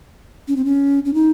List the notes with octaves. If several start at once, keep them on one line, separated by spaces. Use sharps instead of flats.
C#4
C4
C#4
C#4
D#4